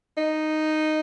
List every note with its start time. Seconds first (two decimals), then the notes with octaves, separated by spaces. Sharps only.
0.18 D#4